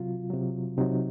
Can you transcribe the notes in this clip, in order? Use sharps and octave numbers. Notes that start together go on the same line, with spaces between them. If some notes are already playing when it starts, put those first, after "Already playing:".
Already playing: C3 F#3 F4
C3 F#3
C3 F#3 D#4